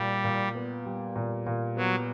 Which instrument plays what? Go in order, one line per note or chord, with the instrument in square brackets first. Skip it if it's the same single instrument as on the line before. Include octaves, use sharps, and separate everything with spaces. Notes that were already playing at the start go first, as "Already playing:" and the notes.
Already playing: [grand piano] A#2 [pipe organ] G3
[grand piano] A#2
B3
G3
A#2
A#2
[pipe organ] F#3 [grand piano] B3